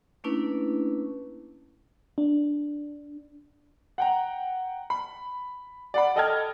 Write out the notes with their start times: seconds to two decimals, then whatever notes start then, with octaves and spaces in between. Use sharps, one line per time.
0.24 A3 A#3 C#4 D4 E4 B4
2.18 D4
3.98 F#5 G5 A#5
4.90 B5
5.94 D5 F#5 B5
6.16 A4 D#5 G5 A5 F6 G#6